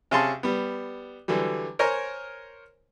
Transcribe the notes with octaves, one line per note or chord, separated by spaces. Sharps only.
C3 C#4 G#4 F5 A5 C6
G3 B3
D3 E3 F#3 G3
A#4 C5 C#5 G#5 A#5